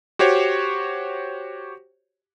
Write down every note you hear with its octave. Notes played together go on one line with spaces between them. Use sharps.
F#4 G4 C5 C#5